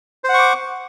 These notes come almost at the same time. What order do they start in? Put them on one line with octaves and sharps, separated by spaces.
C5 F#5 C#6 D6